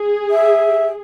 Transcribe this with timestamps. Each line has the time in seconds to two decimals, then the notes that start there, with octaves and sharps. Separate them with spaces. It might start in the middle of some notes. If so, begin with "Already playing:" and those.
Already playing: G#4
0.30 E5